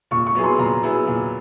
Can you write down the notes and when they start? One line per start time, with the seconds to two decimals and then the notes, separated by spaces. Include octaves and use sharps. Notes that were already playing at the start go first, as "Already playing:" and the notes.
0.11 A#2 C#6
0.27 C#6
0.35 F#3 B3 E4 G#4
0.44 C6
0.58 A#2 A#5
0.83 F#3 B3 E4 G#4
1.07 A#2